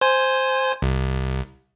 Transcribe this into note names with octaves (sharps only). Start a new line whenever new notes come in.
C5 G#5
C2